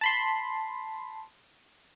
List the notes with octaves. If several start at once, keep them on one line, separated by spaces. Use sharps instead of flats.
A5 B5 C6